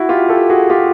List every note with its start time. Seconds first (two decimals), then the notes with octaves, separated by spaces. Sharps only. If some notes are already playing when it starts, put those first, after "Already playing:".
Already playing: E4 F#4
0.09 F4 G4
0.29 G4 A4
0.50 F#4 G#4
0.70 F4 G4